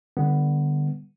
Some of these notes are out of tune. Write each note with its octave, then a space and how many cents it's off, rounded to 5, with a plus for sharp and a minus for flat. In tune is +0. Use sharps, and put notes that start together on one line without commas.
D3 +25 G3 +15 B3 +0